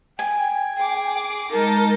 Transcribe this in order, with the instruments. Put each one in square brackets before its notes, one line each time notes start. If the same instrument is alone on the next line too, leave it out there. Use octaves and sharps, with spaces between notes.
[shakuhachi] G5 [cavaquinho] G#5
[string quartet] G#4 D6
[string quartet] G#3 D#4 A5 [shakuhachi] A#4